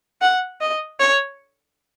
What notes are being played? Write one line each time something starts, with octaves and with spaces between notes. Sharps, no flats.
F#5
D#5
C#5